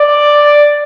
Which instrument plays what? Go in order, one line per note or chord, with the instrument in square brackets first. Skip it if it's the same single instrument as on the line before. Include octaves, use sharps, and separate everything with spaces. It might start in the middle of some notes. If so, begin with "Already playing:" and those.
Already playing: [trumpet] D5